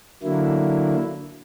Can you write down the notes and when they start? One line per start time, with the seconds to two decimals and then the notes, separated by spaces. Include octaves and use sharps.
0.23 D3 F#3 A#3 E4